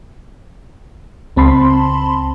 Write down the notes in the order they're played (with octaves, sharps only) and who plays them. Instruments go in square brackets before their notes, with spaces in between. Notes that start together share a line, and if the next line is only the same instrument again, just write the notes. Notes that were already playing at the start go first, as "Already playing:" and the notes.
[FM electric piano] C#2 C4 A5 B5 C6